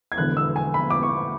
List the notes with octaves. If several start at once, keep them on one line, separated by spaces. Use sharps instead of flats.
G#6
E1 E2 D3 F#6
E6
G#5
B5
D6
C#6